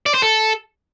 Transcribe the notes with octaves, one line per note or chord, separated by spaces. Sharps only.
D5
C5
A4